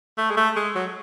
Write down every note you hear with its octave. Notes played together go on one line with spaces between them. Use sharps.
A3
G#3
A3
G#3
F#3